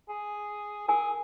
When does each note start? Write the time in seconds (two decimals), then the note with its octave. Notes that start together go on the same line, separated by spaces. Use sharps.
0.09 G#4
0.88 G#4 A#4 G#5